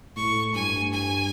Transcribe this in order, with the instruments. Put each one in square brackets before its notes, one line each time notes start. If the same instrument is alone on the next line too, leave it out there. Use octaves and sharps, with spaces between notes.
[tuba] A2 [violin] C#6
[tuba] G2 [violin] G#5
[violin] G#5